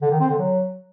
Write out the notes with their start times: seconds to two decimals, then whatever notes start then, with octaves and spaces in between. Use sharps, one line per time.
0.02 D3
0.11 D#3
0.20 C4
0.29 D3
0.38 F#3